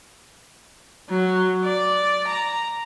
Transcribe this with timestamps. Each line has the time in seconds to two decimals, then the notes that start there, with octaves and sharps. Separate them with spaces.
1.09 F#3
1.64 D5
2.27 A#5